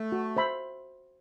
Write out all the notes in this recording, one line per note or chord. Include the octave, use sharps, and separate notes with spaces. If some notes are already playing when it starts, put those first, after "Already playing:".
Already playing: A3
F#4
C5 E5 B5